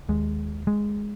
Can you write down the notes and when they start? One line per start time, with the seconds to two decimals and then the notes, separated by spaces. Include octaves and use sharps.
0.09 D#2 G#3
0.67 G#3